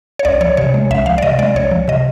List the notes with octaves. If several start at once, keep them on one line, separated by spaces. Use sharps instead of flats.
C#5
C#2 D5
F3 C#5
C3 C#5
G#3
C#2 E5
F3 F5
D5
C3 D#5
G#3 D5
C#2 C#5
F3
C3 D#5